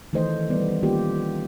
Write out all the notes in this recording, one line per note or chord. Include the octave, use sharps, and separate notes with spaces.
D#3 E3 A3 A4 C5 D#5
G3 B3 D5
D#3 A#3 C#4 F4 G4